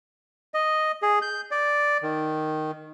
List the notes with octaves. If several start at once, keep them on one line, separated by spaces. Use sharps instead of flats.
D#5
G#4
G6
D5
D#3